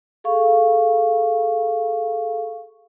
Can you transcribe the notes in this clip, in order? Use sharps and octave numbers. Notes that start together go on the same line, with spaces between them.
G#4 A4 F5 C#6